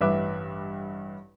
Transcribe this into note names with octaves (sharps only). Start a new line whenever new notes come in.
A1 G2 B4 E5 D6 F#6